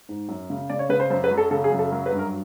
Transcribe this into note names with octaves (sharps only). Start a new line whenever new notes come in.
G#2
F#2
C#3
C#3 D5
C#5
C#3 B4
C5
F#2 C5
B4
F#3
A4
C#3 A4
G#4
F#2
A4
F#3 A#4
B4
G2
A#4